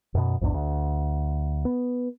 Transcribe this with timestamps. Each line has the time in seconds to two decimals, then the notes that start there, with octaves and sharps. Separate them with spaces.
0.15 F#2 B2
0.41 A#1 E2 G#2 D4
0.54 D2
1.65 B3